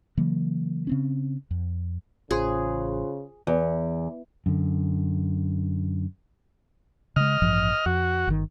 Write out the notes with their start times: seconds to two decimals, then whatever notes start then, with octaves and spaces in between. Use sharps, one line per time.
0.17 C#3 E3 F#3 A#3
0.87 C#3 C4 C#4
1.51 F2
2.31 A1 C#3 F4 G#4 C5 C6
3.47 E2
4.46 F#2 D3
7.16 C#3 G#3 D#5 F6
7.42 A1 G2 F3
7.86 F2 F#4
8.27 G1 D#3